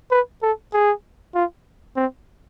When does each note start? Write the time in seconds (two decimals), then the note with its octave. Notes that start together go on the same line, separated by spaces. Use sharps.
0.11 B4
0.42 A4
0.73 G#4
1.35 F4
1.96 C4